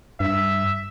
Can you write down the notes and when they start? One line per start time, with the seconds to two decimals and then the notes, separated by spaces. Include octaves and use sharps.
0.20 G2 E5